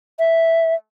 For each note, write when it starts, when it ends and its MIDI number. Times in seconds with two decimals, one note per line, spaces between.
0.19 0.75 76